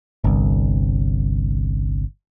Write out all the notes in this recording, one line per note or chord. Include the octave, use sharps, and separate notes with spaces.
G1 C2